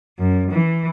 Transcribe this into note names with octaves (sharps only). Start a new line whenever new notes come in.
F#2
E3